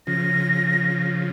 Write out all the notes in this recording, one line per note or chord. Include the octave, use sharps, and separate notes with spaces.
C#3 F3 A#6